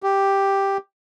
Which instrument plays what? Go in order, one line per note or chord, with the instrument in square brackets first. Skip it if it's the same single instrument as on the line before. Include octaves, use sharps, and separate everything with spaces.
[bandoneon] G4